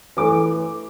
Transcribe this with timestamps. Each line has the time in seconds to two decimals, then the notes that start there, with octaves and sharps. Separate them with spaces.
0.17 E3 A3 D6